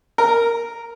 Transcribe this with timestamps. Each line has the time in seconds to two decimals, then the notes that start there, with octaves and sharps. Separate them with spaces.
0.18 A#4